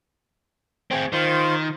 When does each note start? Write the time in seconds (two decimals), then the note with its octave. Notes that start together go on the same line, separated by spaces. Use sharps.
0.91 C4 G#4 G5
1.13 D#3 F4 C5